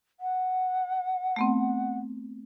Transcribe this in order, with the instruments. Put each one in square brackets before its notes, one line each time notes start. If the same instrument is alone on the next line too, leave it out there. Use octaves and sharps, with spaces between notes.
[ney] F#5
[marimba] A3 B3 C4